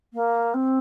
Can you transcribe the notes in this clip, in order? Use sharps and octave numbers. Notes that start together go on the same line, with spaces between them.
A#3
C4